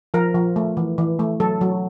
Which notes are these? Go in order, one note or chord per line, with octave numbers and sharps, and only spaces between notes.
F3 A#4
F3
A3
E3
E3
A3
F#3 A4
F#3